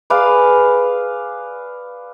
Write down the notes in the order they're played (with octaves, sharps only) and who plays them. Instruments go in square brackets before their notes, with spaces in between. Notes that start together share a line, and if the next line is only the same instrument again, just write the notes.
[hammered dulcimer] G#4 B4 D5 F5